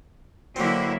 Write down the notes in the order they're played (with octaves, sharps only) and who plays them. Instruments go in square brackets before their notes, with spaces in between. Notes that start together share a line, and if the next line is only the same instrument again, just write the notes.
[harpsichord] D3 C4 [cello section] F#3 A#3 E4